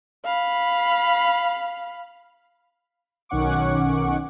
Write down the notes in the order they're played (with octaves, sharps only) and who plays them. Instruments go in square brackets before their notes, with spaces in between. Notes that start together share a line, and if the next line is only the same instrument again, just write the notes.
[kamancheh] F5 B5
[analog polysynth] B1 D#3 C#4 F#5 C#6 D6